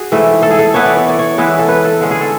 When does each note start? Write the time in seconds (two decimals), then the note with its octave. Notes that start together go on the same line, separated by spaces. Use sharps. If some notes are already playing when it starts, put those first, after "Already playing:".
Already playing: F#4 G#4
0.12 G#2 E3 A3
0.42 A4
0.50 G#4
0.59 A4
0.74 E3 B3 E4 C#5
0.86 D5
0.97 C#5
1.09 D5
1.19 C#5
1.38 E3 G#3 B3 E4
1.59 A4
1.68 B4
1.84 A4
2.01 D3 G#3 C#4
2.11 G#4
2.21 A4